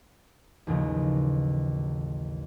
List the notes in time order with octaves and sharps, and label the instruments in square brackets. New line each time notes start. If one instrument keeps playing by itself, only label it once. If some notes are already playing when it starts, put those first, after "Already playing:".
[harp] A1 D#2 C#3 F3